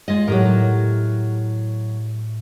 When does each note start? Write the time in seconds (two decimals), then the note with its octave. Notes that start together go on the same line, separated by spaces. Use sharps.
0.08 G#3 F4 D#5
0.27 A2 F#3 G4 A#4